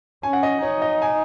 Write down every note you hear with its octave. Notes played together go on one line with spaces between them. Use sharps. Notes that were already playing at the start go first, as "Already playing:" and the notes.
C#4 G#5
F#5
D#5
D#4 C#5
D#5
G#5